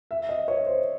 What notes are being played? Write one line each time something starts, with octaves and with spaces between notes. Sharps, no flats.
E5
D#5
C#5
C5